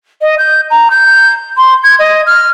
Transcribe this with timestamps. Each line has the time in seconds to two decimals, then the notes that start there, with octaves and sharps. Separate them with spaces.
0.21 D#5
0.38 G6
0.70 A#5
0.91 G6
1.57 C6
1.84 G#6
1.99 D#5
2.26 F6